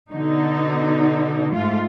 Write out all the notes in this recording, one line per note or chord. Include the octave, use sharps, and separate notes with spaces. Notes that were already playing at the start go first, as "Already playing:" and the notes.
B2 D3 D#4
G#2 A3 F4